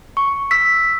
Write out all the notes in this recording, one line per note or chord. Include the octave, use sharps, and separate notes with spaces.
C#6
E6 B6